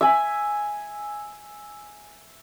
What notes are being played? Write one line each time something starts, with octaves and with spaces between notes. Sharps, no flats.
E5 G#5